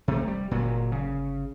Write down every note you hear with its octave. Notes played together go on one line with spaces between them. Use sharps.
A#1 C3 A3
E1 G3
G1 A#2 F#3
C#3